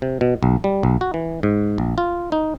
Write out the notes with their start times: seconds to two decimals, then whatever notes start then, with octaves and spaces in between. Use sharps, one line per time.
0.02 C3
0.21 B2
0.43 B1
0.64 G3
0.83 B1
1.01 F#4
1.14 E3
1.43 G#2
1.78 A#1
1.98 F4
2.32 D#4